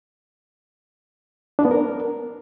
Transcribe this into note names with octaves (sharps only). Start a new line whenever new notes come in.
D4
B3
A#4